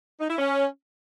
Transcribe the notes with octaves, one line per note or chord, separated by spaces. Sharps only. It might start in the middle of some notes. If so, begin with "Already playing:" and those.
D#4
E4
C#4